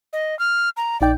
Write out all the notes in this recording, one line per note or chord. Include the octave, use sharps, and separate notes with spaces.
D#5
F6
A#5
A#1 D#4 D5 G5